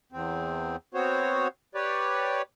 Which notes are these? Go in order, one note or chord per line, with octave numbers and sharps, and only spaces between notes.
E2 C4
B3 C4 F#4 C5 C#5
G4 B4 C#5 D5